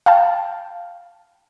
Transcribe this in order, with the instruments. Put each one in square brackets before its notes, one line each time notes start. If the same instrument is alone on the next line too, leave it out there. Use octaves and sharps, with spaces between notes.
[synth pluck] F5 G5 A5